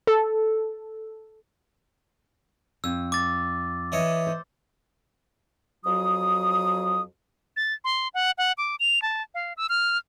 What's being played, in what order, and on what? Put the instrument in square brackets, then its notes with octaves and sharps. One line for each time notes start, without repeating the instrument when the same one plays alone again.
[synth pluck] A4
[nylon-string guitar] F2 [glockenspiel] E6
[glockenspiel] D6 A6
[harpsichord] E3 C#5 D#5
[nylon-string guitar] C5
[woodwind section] F2 F#3 F#4 D#6
[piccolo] A6
C6
F#5
F#5
D6
F7
A5
F5
E6
F6